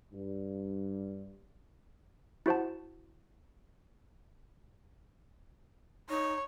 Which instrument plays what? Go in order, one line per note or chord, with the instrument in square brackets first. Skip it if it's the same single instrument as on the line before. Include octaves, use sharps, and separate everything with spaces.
[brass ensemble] G2
[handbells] E4 F#4 C5 F#5 A5
[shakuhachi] D#4 [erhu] C#5